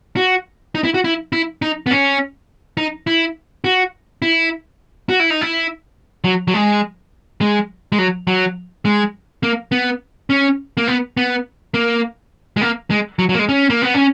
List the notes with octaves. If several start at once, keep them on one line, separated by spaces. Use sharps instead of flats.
F#4
D#4
E4
F#4
E4
E4
D#4
B3
C#4
D#4
E4
F#4
E4
F#4
E4
D#4
E4
F#3
F#3
G#3
G#3
G#3
F#3
F#3
G#3
A#3
B3
C#4
A#3
B3
B3
A#3
G#3
A#3
G#3
F#3
F#3
A#3
G#3
C#4
A#3
B3
C#4